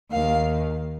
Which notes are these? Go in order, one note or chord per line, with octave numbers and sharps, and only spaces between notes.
D#2 D#3 F5